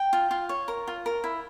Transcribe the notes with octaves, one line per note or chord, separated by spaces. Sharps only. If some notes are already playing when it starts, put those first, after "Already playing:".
Already playing: G5
F4
F4
C#5
A#4
F4
A#4
E4